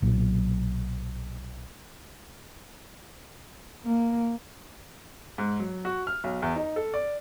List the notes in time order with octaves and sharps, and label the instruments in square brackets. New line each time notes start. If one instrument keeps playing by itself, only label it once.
[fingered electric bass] B1 A#2 F#3
[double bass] A#3
[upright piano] G#2
F#3
F#4
F6
B1
E2
D#4
A4
D5